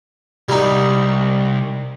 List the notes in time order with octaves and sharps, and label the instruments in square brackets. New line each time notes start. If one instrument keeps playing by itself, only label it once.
[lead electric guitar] C2 [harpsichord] G3 D#4